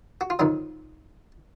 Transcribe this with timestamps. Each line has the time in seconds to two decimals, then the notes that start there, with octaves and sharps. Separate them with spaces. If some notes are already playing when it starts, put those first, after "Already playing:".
0.21 F#4
0.30 F4
0.39 F2 D#3 F#3 D#4